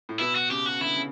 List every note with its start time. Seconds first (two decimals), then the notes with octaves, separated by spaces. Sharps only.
0.09 A2
0.20 B2 E4
0.35 F#4
0.50 C#3 G4
0.66 F#4
0.81 D3 E4
0.96 C#3